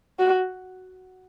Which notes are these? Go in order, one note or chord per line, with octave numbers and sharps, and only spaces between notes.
F#4